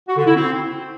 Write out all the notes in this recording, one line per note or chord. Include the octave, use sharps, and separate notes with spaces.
F#4
D3
E4
C4